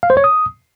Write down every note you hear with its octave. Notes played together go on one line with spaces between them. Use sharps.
F5
C5
C#5
D#6